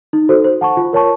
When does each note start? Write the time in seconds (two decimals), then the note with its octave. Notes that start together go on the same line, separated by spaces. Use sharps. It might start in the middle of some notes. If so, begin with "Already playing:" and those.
0.13 D#4
0.29 F#4 A4 C5
0.44 C5
0.61 F#5 A5 C#6
0.77 F4
0.93 A#4 C#5 A5 C#6